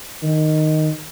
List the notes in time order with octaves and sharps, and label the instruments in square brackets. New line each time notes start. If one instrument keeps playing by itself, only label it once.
[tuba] D#3